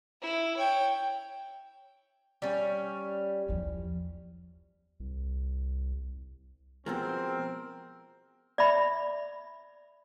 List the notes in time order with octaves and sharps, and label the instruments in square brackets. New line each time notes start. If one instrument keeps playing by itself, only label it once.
[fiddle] E4
C#5 G5
[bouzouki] G3 C#4
[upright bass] E2 F3
[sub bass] C2
[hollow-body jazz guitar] B2 F3 G#3 [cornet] C4 [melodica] A#4
[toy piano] D5 E5 B5